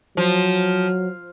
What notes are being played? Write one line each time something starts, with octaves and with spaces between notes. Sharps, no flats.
F3 F#3